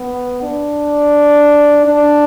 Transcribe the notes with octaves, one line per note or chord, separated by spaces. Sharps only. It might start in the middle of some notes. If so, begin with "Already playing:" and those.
Already playing: B3
D4
D4